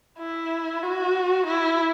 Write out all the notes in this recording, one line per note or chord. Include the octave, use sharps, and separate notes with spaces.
E4
F#4
E4